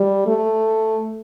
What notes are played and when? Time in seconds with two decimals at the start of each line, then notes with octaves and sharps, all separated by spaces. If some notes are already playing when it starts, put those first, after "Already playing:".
Already playing: G3
0.27 A3